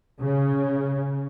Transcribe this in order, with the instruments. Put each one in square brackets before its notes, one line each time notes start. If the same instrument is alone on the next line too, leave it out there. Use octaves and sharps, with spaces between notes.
[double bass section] C#3